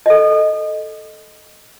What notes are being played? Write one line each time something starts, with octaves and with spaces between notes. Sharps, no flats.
A4 D#5